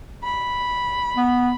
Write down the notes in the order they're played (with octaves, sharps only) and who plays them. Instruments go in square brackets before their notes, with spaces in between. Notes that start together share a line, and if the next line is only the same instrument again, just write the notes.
[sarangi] B5
[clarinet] B3